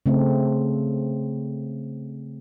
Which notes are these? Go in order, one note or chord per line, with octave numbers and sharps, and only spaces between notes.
C#3 A3 C4